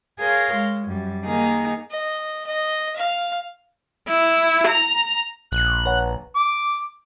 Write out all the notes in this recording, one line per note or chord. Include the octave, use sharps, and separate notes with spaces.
G#4 A#4 C#5 F5 C6
G#3
F#2 G3
D#3 A#3 D#4 G#4
D#5
D#5
F5
E4
A#5
A#1 F#6
B4 C#5 F#5
D6